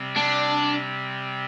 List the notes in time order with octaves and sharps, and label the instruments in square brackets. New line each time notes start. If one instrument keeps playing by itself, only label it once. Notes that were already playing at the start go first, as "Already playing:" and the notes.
Already playing: [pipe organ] C3 G3 C4
[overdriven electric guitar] D4